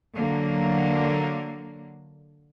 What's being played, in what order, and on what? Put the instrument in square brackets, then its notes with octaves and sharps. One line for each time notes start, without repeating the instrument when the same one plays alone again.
[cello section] D3 F#3 A#3